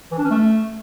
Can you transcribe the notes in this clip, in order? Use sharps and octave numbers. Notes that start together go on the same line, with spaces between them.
E3
D4
C#4
A3